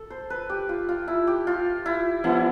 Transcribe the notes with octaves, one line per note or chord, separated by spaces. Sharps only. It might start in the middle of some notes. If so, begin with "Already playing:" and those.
Already playing: A4
C5
B4
G4
F4
F4
E4
G4
F4
E4
F3 B3 D4 E4